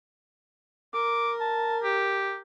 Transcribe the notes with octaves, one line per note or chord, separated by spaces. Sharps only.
A#4 D6
A5
G4